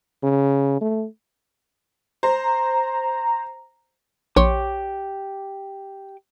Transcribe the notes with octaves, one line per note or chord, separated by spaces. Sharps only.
C#3
A3
C5 A#5
A#1 G4 C#5 C6 D6